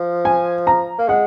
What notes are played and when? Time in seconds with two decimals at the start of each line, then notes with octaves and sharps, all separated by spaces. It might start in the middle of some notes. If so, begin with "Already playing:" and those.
Already playing: F3
0.25 G#5
0.67 A#5
0.98 A#3
1.08 G#3 F#5